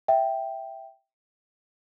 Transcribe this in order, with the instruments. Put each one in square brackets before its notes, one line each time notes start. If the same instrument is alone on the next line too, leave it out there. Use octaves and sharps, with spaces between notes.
[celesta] E5 G5